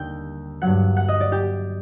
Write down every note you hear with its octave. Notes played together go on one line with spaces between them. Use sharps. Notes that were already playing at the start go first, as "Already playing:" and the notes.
Already playing: D#2 D3 G3 G5
G2 F#3 F#5
F#5
D#5
D5
G4